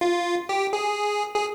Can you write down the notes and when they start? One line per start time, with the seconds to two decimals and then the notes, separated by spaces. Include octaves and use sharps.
0.01 F4
0.49 G4
0.73 G#4
1.35 G#4